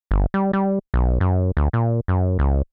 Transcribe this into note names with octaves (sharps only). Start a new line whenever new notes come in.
G1
G3
G3
B1
F#2
D2
A#2
F#2
C#2